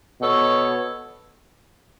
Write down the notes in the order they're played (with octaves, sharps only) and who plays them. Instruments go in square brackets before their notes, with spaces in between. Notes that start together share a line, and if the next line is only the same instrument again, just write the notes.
[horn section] B2 B3 A4 C#5